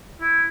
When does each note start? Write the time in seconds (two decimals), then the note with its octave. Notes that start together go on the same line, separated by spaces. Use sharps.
0.21 E4